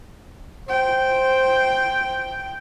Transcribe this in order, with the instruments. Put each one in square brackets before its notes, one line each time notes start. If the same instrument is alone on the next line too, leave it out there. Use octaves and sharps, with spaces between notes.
[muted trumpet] C5 [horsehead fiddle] G5